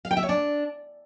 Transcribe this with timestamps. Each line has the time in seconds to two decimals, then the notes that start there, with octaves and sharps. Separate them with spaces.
0.05 F5
0.11 G5
0.17 E5
0.23 C#5
0.29 D4